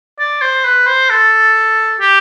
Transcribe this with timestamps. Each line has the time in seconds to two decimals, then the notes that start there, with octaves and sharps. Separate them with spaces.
0.19 D5
0.41 C5
0.65 B4
0.87 C5
1.10 A4
2.00 G4